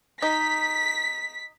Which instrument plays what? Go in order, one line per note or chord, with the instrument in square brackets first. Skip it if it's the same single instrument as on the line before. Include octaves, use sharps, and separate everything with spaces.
[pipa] D#4 [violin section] B6